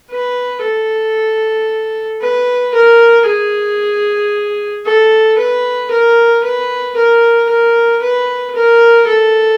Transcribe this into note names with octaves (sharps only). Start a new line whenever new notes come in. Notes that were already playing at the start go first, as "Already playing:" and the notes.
B4
A4
B4
A#4
G#4
A4
B4
A#4
B4
A#4
A#4
B4
A#4
A4